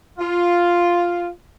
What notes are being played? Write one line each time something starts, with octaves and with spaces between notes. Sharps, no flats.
F4